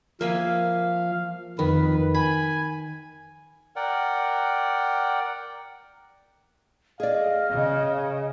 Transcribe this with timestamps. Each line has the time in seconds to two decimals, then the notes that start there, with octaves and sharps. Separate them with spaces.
0.21 F3 A#3 E5 F5 G#5
1.59 F2 D#3 B4
2.15 G#5 B5
3.76 A#4 D5 F#5 G5
7.00 G#4 D5 D#5 F5
7.51 C#3